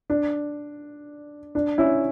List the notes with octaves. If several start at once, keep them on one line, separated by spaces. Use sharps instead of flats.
D4
D4
C#4 E4